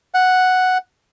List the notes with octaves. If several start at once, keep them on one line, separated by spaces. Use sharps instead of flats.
F#5